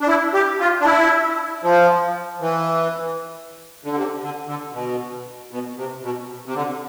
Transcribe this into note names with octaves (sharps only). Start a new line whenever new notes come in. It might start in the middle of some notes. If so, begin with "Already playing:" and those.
D4
E4
G4
F4
D4
E4
F3
E3
D3
C3
D3
D3
B2
B2
C3
B2
C3
D3